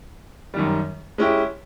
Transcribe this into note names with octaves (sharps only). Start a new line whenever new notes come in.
F#2 D#3 G3
G#3 C#4 E4 G4